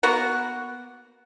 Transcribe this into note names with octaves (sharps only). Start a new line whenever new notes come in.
A#3 B3 F#4 F#5